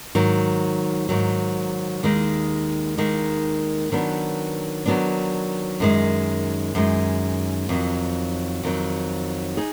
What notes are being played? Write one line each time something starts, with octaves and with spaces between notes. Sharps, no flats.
G#2 D#3 F#3
G#2 D#3 F#3
D#2 D#3 G#3 D#4
D#2 D#3 G#3 D#4
D#3 F#3 B3 D4
D#3 F#3 B3 D4
F#2 D#3 G#3
F#2 D#3 G#3
F2 D#3 F#3
F2 D#3 F#3
D#4 G#4